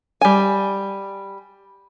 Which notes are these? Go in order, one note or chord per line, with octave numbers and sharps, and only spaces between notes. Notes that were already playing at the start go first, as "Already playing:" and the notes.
G3 G#5